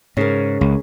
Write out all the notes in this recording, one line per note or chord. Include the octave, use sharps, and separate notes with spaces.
G#2 C#3 A#4
C#2